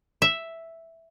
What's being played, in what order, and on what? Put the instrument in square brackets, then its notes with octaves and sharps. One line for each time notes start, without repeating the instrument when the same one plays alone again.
[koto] E5